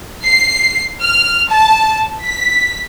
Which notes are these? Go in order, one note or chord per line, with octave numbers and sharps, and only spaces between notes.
C7
F6
A5
B6